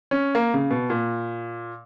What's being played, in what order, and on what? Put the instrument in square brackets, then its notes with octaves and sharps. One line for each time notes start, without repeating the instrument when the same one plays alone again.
[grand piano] C#4
A#3
C#3
B2
A#2